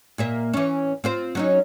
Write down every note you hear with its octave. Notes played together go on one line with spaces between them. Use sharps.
A#2 A#3 E5
E3 C#4
C4 F4 C5
F#3 C#4 D#4